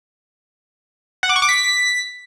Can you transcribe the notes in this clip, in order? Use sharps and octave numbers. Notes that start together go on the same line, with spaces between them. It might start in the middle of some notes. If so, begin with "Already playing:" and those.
F#5
D6
C#6
D6
B6